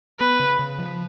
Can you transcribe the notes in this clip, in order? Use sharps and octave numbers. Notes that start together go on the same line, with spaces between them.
B3 B4
C#3
C#3
F3